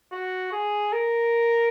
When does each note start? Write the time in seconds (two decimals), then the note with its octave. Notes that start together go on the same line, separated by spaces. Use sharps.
0.12 F#4
0.52 G#4
0.93 A#4